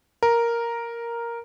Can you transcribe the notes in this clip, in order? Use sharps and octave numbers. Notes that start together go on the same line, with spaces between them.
A#4